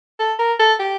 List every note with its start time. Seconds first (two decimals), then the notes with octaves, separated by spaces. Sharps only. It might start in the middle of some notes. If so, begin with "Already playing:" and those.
0.20 A4
0.39 A#4
0.59 A4
0.79 G4